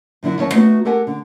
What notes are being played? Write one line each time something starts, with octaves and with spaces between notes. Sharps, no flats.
F#2 D3 F#3 E4
F#2 D#3 C#5 A5
A3 B3 D#4 F#4
G4 A4 A#4 F#5 G#5
D3